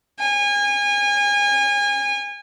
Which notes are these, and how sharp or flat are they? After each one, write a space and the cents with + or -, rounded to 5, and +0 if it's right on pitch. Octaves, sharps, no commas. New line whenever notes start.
G#5 -30